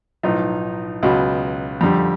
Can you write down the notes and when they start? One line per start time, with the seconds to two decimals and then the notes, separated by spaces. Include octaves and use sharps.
0.23 B1 A2 F3 D#4
1.03 C#2 B2 F#3
1.81 F2 D3 G3